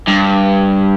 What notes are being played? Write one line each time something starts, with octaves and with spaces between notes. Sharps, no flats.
G2